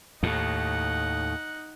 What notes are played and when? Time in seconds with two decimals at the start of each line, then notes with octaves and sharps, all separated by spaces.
0.23 D#2 A2 D#4 F#5